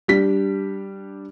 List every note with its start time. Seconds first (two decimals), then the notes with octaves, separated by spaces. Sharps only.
0.08 G3 D4 G4 B6